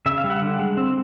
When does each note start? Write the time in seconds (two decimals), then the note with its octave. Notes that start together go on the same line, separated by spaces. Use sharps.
0.06 C#3 E5
0.18 F5
0.24 G3
0.30 F#5
0.42 D3
0.59 G#3
0.77 C4